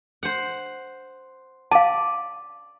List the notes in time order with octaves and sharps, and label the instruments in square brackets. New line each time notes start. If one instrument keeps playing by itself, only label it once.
[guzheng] C5 F#5
[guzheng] D5 [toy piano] F5 A5